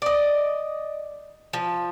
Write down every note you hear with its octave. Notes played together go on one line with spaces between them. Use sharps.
D5 D#5
F3